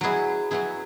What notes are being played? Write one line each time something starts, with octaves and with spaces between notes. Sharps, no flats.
F#3 B3 E4 G#4
F#3 B3 E4 G#4